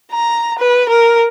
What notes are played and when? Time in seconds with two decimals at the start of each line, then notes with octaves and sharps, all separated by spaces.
0.12 A#5
0.59 B4
0.89 A#4